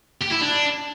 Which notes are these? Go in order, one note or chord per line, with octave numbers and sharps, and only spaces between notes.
G4
E4
D4